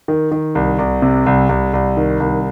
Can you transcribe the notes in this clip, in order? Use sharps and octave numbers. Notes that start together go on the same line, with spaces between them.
D#3
D#3
C2
C2
C3
C2
C2
C2
D#3
C2